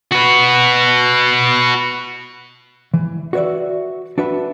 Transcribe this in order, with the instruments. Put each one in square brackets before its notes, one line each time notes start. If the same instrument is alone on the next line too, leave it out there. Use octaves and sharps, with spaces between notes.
[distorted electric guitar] F#4 B4
[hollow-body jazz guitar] E3
F#4 B4 C#5 D5 E5
D4 F#4 B4 E5